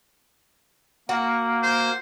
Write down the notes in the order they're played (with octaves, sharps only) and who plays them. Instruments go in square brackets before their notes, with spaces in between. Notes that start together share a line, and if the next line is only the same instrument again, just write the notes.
[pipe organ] A#3 [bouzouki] F#4
[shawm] C5